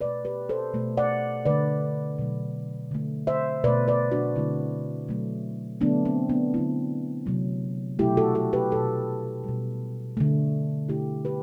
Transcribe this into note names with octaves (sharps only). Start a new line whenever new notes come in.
B2 A3 B4 D5
G4 B4
A4 C5
B2 A3
D5 F#5
D3 A3 B4 D5
B2 F#3 A3
D3 A3
C5 E5
B2 A3 B4 D5
B4 D5
D4 F#4
D3 A3 C4 E4
B2 F#3 A3
D3 F#3 A3 B3 D4
C4
B3 D4
D3 F#3 A3 C4 E4
C3 F#3 A3
B2 F#3 A3 E4 G4
F#4 A4
F#4 A4
G4 B4
B2 A3 F#4 A4
B2 G3
D3 A3
B2 A3 E4 G4
G4 B4